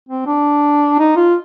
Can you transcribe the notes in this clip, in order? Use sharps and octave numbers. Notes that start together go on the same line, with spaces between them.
C4
D4
D#4
F4